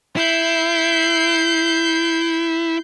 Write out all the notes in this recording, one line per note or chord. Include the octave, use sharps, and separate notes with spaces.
E4 G6 C7